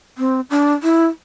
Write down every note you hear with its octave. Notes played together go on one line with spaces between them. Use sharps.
C4
D4
E4